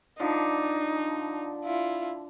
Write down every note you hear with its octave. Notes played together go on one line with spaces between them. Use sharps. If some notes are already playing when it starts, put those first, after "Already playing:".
D3 F3 D#4
E4 F4